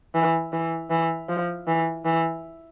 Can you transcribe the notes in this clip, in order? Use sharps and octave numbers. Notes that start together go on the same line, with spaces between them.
E3
E3
E3
F3
E3
E3